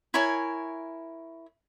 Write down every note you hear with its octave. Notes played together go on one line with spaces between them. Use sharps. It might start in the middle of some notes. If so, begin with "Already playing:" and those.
E4 A#4 C#5 G#5